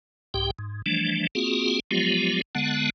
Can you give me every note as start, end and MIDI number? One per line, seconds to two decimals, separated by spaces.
0.34 0.51 36
0.34 0.51 44
0.34 0.51 67
0.34 0.51 79
0.59 0.82 44
0.86 1.27 52
0.86 1.27 53
0.86 1.27 55
0.86 1.27 57
0.86 1.27 62
1.35 1.80 58
1.35 1.80 60
1.35 1.80 65
1.35 1.80 66
1.35 1.80 68
1.91 2.41 53
1.91 2.41 54
1.91 2.41 56
1.91 2.41 59
1.91 2.41 65
1.91 2.41 67
2.55 2.90 50
2.55 2.90 56
2.55 2.90 59
2.55 2.90 78
2.55 2.90 81